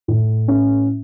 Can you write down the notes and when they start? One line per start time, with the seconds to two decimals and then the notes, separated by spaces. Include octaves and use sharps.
0.08 A2
0.48 C#4